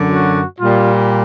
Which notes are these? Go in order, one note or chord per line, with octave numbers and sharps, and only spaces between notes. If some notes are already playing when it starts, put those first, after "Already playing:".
Already playing: F#2 D3 F#3
F#4
A#2 G3 F4